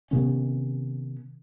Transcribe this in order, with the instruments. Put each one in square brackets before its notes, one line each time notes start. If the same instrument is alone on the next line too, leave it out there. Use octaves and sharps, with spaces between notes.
[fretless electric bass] C3 D#3 B3 C#4